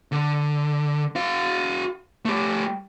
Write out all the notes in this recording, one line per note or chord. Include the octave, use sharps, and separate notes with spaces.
D3
F#4 F5
A3 G4